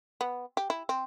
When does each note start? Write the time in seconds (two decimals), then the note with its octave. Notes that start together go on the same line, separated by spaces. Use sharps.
0.21 B3
0.57 G4
0.70 E4
0.89 C4